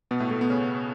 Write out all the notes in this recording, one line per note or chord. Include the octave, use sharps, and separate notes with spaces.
B2 B3
A2 A3
A2 A3
B2 B3
C#3 C#4